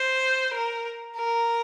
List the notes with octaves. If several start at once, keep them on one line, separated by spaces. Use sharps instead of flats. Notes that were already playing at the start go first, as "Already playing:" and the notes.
Already playing: C5
A#4
A#4